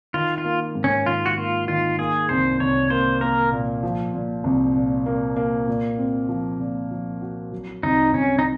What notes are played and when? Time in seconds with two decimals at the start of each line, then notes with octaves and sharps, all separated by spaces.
0.14 D#3 F4
0.38 F4
0.45 A#3
0.75 G#2
0.84 C#4
1.06 D#3 F4
1.26 F#4
1.37 A#3 F4
1.68 D#3 F4
1.99 A#3 G#4
2.29 C2 C5
2.60 C2 C#5
2.90 A#3 C5
3.21 A#3 A#4
3.52 A#2
3.83 F3
4.14 A#2
4.44 C2
4.75 A#2
5.06 A#3
5.37 A#3
5.67 A#2
5.98 C4
6.29 F3
6.60 A#2
6.91 F3
7.21 F#4
7.52 F#3
7.83 C2 D#4
8.13 C2 C#4
8.39 D#4